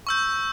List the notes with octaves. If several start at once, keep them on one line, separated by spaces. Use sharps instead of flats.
C#6 E6 G6